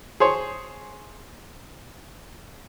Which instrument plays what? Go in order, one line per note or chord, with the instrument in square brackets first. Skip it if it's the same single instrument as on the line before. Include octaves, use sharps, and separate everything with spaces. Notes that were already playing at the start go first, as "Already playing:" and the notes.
[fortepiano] G#4 C5 C#5